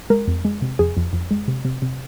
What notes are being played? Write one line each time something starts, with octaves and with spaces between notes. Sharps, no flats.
G#3 A#4
F2
G#3
C3
F2 G#4
F2
F2
G#3
C3
C3
C3